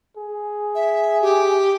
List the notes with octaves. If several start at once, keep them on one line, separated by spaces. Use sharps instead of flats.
G#4
E5
G4